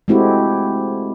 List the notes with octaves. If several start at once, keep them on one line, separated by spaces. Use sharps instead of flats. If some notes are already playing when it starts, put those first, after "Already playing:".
G#3 A3 C4 E4 F#4 G4